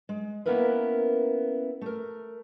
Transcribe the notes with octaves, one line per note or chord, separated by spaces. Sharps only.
G#3
A#3 B3 C#4 E4 A#4 B4
A3 A#4